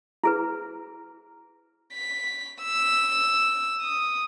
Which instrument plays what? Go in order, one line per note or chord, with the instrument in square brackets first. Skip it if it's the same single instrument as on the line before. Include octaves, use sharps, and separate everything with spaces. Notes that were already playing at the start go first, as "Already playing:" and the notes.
[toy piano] E4 G#4 B4
[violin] B6
E6
D#6